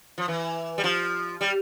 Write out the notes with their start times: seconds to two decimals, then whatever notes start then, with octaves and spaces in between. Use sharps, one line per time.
0.18 F3
0.28 E3
0.78 G3
0.84 F3
1.41 G3